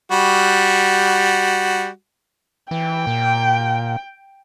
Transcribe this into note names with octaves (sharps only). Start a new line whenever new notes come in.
G3 F#4
E3 G5
A#2